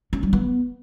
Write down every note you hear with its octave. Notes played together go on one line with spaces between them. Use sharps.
C#4
G3
B3